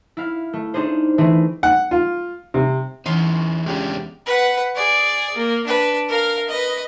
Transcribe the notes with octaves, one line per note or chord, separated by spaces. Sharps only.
E4 F5
A3
D4 D#4 G#4 C5
E3 A3 C4 G#4
F#5
F4
C3
E2 E3 C#4 D#4 C6
C#2 C#3 G#3 C#4 D4 G4
B4 F#5
G#4 D5
A#3
D4 B4
A#4 F5
B4 D#5